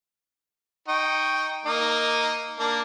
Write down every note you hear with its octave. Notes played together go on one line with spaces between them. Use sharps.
D#4 G5 C#6
A#3 D#4
A#3 D4